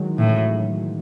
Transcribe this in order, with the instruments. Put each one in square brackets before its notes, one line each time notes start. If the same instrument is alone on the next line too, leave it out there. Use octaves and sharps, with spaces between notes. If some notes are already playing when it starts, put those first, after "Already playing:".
Already playing: [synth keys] D#3 E3 F#3 G#3
[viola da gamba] A2 [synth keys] C#3 E3